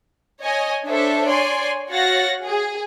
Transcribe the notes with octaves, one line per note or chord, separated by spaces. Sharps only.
C#5 D#5 G#5
D4 A4 C5 C#5 E5
C#5 D5 G#5 C6
F#4 C#5 F5 F#5 A6 A#6
G#4